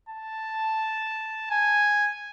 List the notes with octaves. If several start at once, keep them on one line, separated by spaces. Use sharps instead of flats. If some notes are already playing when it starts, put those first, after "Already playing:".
A5
G#5